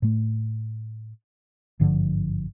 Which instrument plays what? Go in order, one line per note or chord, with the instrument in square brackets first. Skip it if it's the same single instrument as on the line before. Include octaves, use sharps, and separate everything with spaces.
[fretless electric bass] A2 A3
G#1 G2 D3 F3